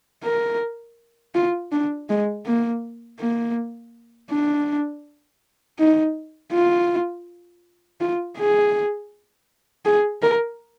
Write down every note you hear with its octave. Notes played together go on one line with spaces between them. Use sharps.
A#4
F4
D4
G#3
A#3
A#3
D4
D#4
F4
F4
G#4
G#4
A#4